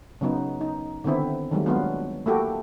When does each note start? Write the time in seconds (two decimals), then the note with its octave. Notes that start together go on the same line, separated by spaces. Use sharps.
0.21 C#3 F#3 B3 D#4
0.61 D#4
1.04 D3 D#3 B3 C4 E4
1.51 D#3 F#3 G3 A3
1.66 F#3 G#3 A#3 B3 D4 F4
2.26 A3 A#3 E4 F#4 G4 A4